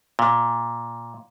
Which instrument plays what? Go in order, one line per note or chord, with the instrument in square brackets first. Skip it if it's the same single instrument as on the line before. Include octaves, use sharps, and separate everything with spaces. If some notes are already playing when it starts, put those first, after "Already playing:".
[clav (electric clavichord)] A#2